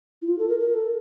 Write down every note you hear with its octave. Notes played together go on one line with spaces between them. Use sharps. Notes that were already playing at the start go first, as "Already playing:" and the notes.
E4
F4
A4
A#4
A#4
A4